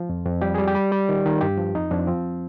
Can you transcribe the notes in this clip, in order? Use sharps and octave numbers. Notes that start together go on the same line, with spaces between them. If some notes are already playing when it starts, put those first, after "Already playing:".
Already playing: F3
F2
F2
G3 G4
G3 G#4
G4
G3
G3
D#3
D#3
G2 G4
F3
F2 D#4
F2 D4
F3 C4